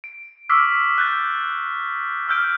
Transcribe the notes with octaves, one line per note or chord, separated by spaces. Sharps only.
D7
C#6 D6 E6 F6 B6 C7
F#6 G6 A6
D6 E6 F6 G6 D7